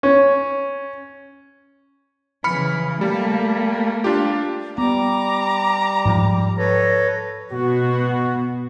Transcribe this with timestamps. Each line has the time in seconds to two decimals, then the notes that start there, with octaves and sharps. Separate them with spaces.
0.03 C#4
2.44 C#3 E3 B5 F6 C#7
3.01 G3 A3 A#3
4.04 D4 F4 G4
4.78 G3 B3 A#5 D6
6.05 G#2 F3
6.58 A4 B4 C#5 A#6
7.52 B2 F#4